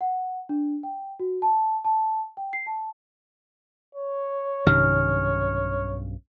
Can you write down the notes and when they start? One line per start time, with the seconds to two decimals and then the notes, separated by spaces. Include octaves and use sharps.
0.01 F#5
0.49 D4
0.83 G5
1.20 F#4
1.42 A5
1.85 A5
2.37 G5
2.53 C7
2.66 A5
3.95 C#5
4.67 B1 G2 C3 D#3 C#4 F6